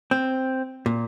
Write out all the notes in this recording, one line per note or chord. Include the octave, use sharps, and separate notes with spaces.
C4
A#2